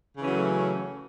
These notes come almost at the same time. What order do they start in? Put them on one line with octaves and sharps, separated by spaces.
C#3 E3 C#4 F#3 A3